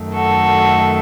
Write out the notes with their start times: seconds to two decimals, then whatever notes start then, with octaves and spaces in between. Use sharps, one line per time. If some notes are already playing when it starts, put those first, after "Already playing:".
Already playing: F#2 D#3 A3
0.14 F#4 A4